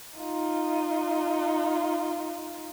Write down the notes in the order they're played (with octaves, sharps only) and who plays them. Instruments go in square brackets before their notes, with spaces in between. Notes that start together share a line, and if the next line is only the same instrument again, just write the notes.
[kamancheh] D#4 F4